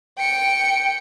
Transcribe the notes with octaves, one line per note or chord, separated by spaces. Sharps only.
G5 C#7